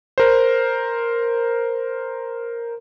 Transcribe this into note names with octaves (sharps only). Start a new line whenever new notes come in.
A#4 C5